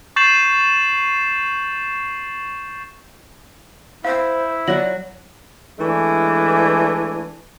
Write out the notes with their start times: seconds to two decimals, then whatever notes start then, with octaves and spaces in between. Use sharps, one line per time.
0.16 C#6 G6 A6 C7 E7 F#7
4.05 E4 C5 F5
4.68 F#3 F#4 C#5 D5 A#6 F#7
5.79 E3 G#3 A3 D4